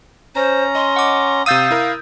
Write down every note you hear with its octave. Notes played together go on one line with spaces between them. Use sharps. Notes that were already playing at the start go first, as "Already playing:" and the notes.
C#4 C5 A#5
D#5 C6
F#5 D6
C3 F5 D#6 E6 G6 A6 D#7
E4 A#4